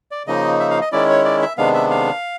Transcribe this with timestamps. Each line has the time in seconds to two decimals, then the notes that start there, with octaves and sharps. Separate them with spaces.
0.11 D5
0.27 C#3 F3 A#3 D#4 D#5
0.60 E5
0.70 F5
0.81 D#5
0.92 D#3 G#3 C#4 E4 D5
1.09 C#5
1.25 D5
1.42 E5
1.58 C3 D#3 G#3 B3 D4 F5
1.74 E5
1.91 F5